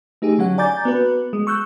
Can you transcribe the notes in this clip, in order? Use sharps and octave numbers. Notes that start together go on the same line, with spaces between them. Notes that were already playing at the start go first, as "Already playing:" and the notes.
A3 D#4 G4 G#4
D3 F#3 C#4 F#5
D5 G#5 A#5 D6 G6 A6
B3 F#4 B4
G#3
C#6 E6 F#6 G6